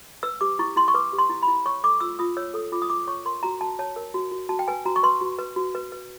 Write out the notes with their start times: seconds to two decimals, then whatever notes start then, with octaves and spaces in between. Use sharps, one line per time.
0.23 B4 E6
0.41 G4 D6
0.59 E4 C#6
0.76 E4 C6
0.88 C#6
0.94 B4 D6
1.13 G4
1.19 C6
1.30 E4
1.42 B5
1.48 E4
1.66 C#5 C#6
1.83 A4 D6
2.01 F4 E6
2.19 F4 D#6
2.37 C#5 E6
2.54 A4 D#6
2.72 F4 D6
2.82 D#6
2.90 F4 D6
3.07 C#5 C#6
3.25 A#4 C6
3.43 F#4 A#5
3.61 F#4 A5
3.79 C#5 A5
3.96 A#4
4.14 F#4
4.32 F#4
4.49 F#4 A5
4.59 G5
4.68 B4 G#5
4.85 F#4 A#5
4.96 C#6
5.03 B4 C6
5.21 F#4
5.39 B4
5.56 F#4
5.75 B4
5.92 B4